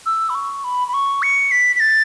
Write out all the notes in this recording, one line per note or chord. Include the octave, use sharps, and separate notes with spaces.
E6
B5
C#6
B5
B5
C#6
C#7
B6
B6
A6